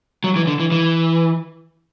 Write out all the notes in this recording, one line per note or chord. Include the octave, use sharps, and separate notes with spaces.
F#3
E3
D3
E3
E3